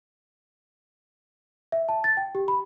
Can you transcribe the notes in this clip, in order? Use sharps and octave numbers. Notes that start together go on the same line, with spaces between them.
E5
A5
A6
G5
G4
B5